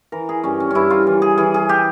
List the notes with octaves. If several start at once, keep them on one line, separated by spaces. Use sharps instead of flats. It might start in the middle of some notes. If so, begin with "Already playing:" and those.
E3 A#4
G#4
G2 C#4
C#4
G2 C#4 E4
F4
E3
G#4
E3 G#4
G#4
G4